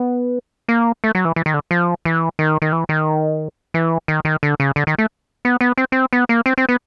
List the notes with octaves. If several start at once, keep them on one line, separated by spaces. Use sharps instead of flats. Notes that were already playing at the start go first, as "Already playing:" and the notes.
Already playing: B3
A#3
A3
F#3
E3
E3
D#3
D3
F3
E3
D#3
D#3
E3
D#3
E3
D#3
D#3
D3
C#3
D3
D#3
A3
B3
B3
C4
C4
B3
A#3
C4
C4
B3